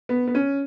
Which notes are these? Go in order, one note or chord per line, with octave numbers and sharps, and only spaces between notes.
B3
B3
C#4